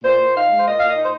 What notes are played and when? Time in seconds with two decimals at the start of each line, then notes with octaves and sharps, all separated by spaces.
0.03 A#2 C5
0.19 A#2
0.34 D#4 F5
0.50 G#3
0.58 C5
0.65 A#2 D#5
0.79 F5
0.82 A#2
0.87 D#5
0.97 D#4
1.03 C5